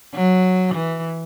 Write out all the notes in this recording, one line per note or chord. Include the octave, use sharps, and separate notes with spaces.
F#3
E3